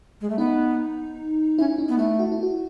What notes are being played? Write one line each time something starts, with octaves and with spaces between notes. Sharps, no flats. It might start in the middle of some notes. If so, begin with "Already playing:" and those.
G#3
A3
B3 D#4
C#4 E4
D#4
B3
A3 E4
F#4
E4
F#4